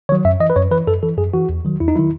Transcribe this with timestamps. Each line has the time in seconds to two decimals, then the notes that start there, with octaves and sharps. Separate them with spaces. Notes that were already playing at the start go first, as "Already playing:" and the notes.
0.09 D#3 C#5
0.12 F#3
0.25 F#2 E5
0.40 E3 D#5
0.50 B4
0.56 F#2 C#5
0.71 E3 B4
0.87 F#2 A4
1.03 E3 A4
1.18 F#2 G#4
1.34 E3 F#4
1.49 E2
1.65 D#3 F#3
1.80 E2 E4
1.88 D#4
1.96 D#3 F#3 E4